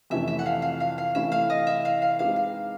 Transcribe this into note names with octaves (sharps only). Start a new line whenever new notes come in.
F2 C3 E3 A3 C#4 E5
E5
F#5
F5
F5
F5
F5
C3 E3 A3 C#4 E4 E5
F5
D#5
E5
F5
F5
G#3 C4 D#4 G4 B4 F5
F5